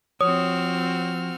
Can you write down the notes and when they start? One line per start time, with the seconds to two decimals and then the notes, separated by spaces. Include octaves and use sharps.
0.21 F3 C4 F#4 C#5 D#6 F6